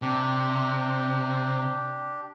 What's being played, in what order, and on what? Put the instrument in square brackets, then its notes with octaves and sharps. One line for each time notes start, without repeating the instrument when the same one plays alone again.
[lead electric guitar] C3 [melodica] D4 G4